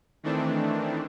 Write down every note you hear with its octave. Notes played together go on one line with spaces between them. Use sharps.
D#3 E3 A3 C4 D4